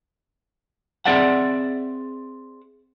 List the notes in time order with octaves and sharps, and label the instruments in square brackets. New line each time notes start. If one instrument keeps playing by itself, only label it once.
[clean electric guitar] C4 G#4 D5 E5 F#5